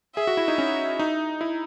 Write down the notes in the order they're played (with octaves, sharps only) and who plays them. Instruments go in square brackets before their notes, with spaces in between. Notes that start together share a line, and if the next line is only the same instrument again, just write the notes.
[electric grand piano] G#4 [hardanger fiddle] E5
[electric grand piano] F#4
E4
D#4
C#4
D#4
E4